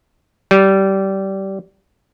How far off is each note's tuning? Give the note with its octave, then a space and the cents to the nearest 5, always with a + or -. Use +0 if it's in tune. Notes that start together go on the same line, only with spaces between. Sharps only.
G3 -20